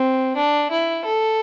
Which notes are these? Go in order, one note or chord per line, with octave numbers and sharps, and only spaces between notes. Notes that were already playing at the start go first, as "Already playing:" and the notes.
Already playing: C4
D4
E4
A4